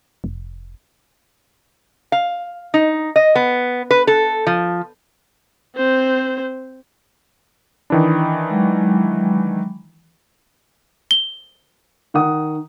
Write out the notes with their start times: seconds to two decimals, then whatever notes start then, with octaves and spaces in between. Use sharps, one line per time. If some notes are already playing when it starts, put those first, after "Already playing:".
0.24 F1
2.12 F5
2.74 D#4
3.16 D#5
3.35 B3
3.91 B4
4.07 A4
4.47 F3
5.76 C4 C5
7.90 D#3 E3 D4 B5 D#6
8.50 F#3 G#3
11.11 G7
12.14 D#3 F#5 D#6